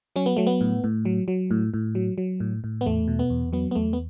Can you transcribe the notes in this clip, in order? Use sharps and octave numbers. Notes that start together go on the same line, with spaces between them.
F#3 C#4
B3
F#3 A3
B3
A2
A2
F#3
F#3
A2
A2
F#3
F#3
A2
A2
B3
E2 A3
B2
B3
E2
F#3 B3
B3
E2 A3
B3